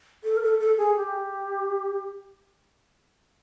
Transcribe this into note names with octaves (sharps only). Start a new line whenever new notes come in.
A4
A#4
A4
A4
G#4
G4